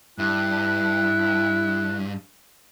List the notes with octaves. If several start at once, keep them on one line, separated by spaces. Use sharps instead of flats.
G2 E4 F#6